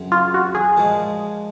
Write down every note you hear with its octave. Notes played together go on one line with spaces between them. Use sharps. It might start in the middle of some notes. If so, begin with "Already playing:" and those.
Already playing: F#2 C#3 F#3 C4
F4
F#4
G#4
A#2 F3 G#3